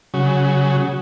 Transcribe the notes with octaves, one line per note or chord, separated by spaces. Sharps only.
C#3 F#3